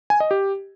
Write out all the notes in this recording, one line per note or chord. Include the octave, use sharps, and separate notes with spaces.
G#5
D#5
G4